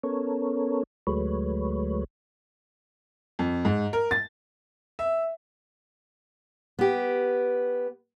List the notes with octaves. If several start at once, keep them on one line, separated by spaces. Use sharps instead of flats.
B3 C#4 A4 A#4 C#5
D2 F#3 G#3 A3 B4 C#5
F2
G#2
A#4
A6
E5
B3 G4